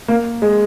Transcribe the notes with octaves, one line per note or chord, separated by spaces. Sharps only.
A#3
G#3